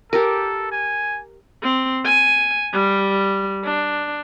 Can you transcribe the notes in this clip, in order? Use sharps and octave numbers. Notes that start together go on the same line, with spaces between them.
G4 A4 A#4
G#5
C4
G#5
G3
D4